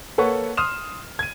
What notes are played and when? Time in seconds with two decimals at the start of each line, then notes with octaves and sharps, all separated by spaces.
0.18 A#3 A4 B4 C#5 F#5 C#6
0.57 C6 D#6 F6 E7
1.19 G#6 D#7